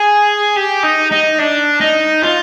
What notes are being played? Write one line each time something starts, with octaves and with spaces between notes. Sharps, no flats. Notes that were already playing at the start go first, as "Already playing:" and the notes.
Already playing: G#4
G4
D#4
D#4
D4
D#4
F4